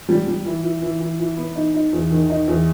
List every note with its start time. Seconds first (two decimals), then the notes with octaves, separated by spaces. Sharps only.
0.09 G3
0.27 G3
0.45 E3
0.63 E3
0.82 E3
1.00 E3
1.19 E3
1.37 B3
1.56 D#4
1.74 D#4
1.93 E2
2.10 D#3
2.30 D#4
2.48 E2